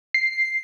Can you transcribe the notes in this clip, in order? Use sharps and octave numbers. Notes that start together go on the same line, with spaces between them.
C7